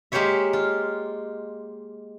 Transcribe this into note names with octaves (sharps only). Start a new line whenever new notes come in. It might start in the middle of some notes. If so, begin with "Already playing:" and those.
G#3 A#3 G4 C5 C#5 E5
F4